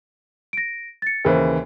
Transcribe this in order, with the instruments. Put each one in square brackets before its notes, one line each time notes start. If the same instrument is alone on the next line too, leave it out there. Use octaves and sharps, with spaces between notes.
[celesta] A#6 D7
A6 C#7
[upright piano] D#2 C#3 E3 [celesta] A#4 C5